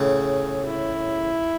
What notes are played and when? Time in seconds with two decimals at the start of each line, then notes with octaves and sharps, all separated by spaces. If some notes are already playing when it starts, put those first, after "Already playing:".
Already playing: A2 C#3 G#4
0.66 E4